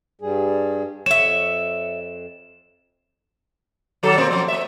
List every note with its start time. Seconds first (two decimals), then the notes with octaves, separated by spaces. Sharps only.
0.21 G2 G3 G#4
1.06 F2 C#5 E5 E7
4.03 D#3 F#3 A4
4.18 B2 A#3 C4
4.31 F3 F#3 C4
4.48 A3 E5